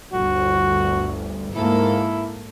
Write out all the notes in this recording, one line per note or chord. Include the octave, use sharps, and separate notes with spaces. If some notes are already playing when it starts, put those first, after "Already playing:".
G1 D2 F#4
G#2 A#3 E4 A4